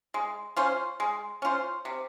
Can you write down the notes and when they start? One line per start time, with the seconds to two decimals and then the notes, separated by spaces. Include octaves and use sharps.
0.14 G#3
0.56 C#4 F4 C5
1.00 G#3
1.42 C#4 F4 C5
1.85 C3